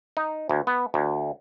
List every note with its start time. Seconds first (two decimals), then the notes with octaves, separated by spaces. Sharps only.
0.17 D#4
0.49 D2
0.67 B3
0.94 D2